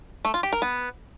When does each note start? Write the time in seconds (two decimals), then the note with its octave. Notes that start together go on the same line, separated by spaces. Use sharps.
0.25 A3
0.34 F4
0.43 G4
0.53 A#4
0.62 B3